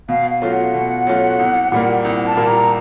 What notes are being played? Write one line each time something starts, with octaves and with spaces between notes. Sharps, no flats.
B2 F5
F5
F#3 A3 C#4 F4
F#5
B2
F#3 A3 C#4 F4
C2
A#2 G3 A#3
C2
A5
A#2 G3 A#3
A#5